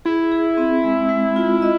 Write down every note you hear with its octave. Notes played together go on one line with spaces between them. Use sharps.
E4 G#4
G#4
C4
G#3
G#3
F4
D#5